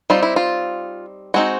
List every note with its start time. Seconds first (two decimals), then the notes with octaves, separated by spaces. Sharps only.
0.10 G3 C4 D#4 F4
0.23 E4
0.36 F4
1.34 G#3 C4 D#4 F#4